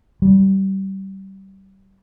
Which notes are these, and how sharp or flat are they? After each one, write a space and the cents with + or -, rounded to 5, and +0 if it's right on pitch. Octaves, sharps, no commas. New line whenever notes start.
G3 -25